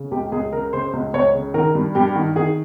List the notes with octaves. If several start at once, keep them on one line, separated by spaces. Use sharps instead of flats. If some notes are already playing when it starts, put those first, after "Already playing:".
Already playing: C#3
C#2 G4
C#2 G#4
C#3 A#4
C#3 C5
C#2
C#2 C#5
C#3
D#3 A#4
G2
G2 G4
D#3
D#3 G#4